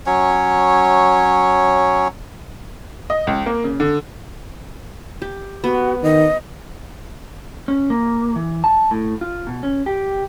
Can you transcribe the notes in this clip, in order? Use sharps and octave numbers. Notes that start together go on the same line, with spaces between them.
F#3 C#4 C#5
D#5
C#2
A#3
C#3
D3
G4
B3 F#4
D#3 D#5
C#4
A#3
E3
A5
A2
F4
B2
C#4
G4